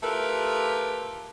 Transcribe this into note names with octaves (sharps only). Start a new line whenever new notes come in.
A3 E4 F4 G4 A#4 B4